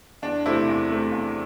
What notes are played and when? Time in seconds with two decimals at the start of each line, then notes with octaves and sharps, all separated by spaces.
0.22 E2 D4
0.46 C3 A3 C4 E4
0.67 E2
0.90 C3 A3 C4
1.12 E2